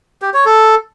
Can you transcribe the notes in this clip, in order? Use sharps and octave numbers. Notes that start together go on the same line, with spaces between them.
G4
C#5
A4